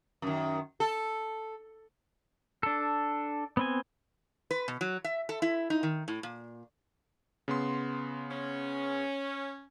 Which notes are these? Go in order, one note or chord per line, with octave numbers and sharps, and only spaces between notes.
F#2 D#3
A4
D4 A4
B3 C4 G#5
B4
B2
F#3
E5
A4
E4
D#4
D#3
A2
A#2
C#3 B3 C6
C#4